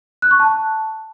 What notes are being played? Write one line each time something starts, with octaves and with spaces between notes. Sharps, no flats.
F#6
C#6
A5